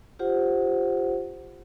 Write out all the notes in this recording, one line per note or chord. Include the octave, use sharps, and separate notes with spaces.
F4 G4 C5 F#5